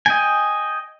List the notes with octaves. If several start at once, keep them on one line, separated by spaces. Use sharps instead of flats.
D#5 G5 G#5